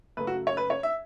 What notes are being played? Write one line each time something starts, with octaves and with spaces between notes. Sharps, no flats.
F#2 C#3 A3 B4
F#4
C#5
B4
C#5
E5